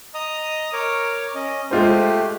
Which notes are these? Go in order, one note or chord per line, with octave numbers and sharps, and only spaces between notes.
D#5 A#5 D#6
A#4 C#5 D6
C#4 D#5
G#3 A3 F4 G4 C5